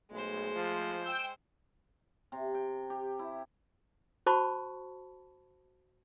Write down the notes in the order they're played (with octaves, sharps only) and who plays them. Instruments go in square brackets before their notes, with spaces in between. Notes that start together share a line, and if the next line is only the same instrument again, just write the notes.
[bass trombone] B1 [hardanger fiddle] G#3 C5 [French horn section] A3 G#4
[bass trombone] F3
[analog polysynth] G5 E6 G6
[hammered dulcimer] C3
G5
G4
E4
[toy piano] F#4 C5 A5 B5 C#6